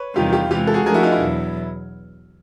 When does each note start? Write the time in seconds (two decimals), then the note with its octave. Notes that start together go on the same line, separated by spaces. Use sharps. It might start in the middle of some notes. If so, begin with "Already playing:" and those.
Already playing: B4 C#5
0.16 E2 C3 D#3 G3 F4 G4
0.33 F4 G4
0.51 C3 E3 G#3 F4 G4
0.67 A4
0.74 F#4 G#4
0.86 F3 A3 D4 G#4 A#4
0.94 E4 F#4
1.03 D#4 F4
1.12 E4
1.21 E2 B2 F#3